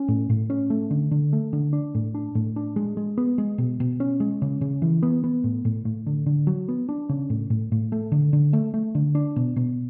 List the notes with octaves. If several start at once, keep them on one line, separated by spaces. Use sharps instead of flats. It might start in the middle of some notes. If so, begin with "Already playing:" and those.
Already playing: C#4
A2
A2
C#4
A3
D3
D3
A3
D3
D4
A2
D4
A2
D4
G#3
G#3
B3
G#3
B2
B2
C#4
G#3
C#3
C#3
E3
B3
B3
A2
A2
A2
D3
D3
F#3
B3
D4
C#3
A2
A2
A2
A3
D3
D3
A3
A3
D3
D4
B2
B2